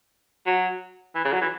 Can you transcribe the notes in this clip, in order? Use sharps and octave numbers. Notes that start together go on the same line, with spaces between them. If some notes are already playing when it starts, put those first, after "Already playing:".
F#3
E3
C#3
F#3
E3